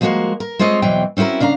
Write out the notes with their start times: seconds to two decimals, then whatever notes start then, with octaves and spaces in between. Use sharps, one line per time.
0.01 F3 G#3 A#3 F4 F#4 A#4
0.40 A#4
0.59 G#3 C4 F4 C#5 D#5
0.82 E2 B2 E3 F#3 C4 G5
1.17 C4 C#4 E4 F#4 A#4
1.40 C#3 D4 F5 A#5